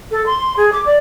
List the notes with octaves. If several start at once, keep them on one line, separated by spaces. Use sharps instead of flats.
A4
C6
G#4
D6
D5